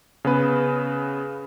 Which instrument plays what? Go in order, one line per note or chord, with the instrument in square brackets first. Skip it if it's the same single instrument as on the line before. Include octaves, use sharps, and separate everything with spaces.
[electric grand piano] C#3 B3 B4